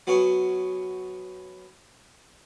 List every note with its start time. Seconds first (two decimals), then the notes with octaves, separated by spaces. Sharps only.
0.07 F#3 B3 C#4 F#4